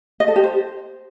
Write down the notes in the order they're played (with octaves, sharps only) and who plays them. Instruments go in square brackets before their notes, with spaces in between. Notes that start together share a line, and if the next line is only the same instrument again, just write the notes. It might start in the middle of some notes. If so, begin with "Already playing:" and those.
[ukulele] D#5
A4
G4
C5